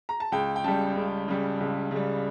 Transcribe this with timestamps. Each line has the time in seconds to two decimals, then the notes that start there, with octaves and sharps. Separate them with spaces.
0.09 A#5
0.20 A5
0.32 C#2 G5
0.56 G5
0.64 C#3 G3 A5
0.96 C#2
1.28 C#3 G3
1.60 C#2
1.91 C#3 G3